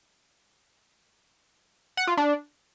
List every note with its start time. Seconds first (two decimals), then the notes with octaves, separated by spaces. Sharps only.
1.97 F#5
2.07 F4
2.17 D4